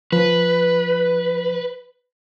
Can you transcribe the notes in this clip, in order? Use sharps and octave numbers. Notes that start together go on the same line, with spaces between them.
F3 B4